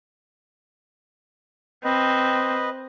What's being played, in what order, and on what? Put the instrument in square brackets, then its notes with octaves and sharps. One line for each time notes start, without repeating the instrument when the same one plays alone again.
[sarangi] C4 [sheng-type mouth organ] B4 D#5